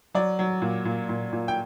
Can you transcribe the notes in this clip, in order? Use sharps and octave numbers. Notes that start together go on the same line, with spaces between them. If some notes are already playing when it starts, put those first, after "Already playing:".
F#3 D5
F#3
A#2
A#2
A#2
A#2
G5